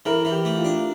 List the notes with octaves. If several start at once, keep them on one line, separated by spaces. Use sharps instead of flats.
E3 A#4
E3
G4
A3
F4
D4